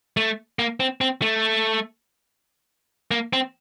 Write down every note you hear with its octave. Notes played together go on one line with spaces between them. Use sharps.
A3
A#3
C4
C4
A3
A#3
C4